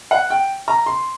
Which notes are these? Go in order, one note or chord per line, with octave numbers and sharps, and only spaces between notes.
F#5
G5
A#5
C6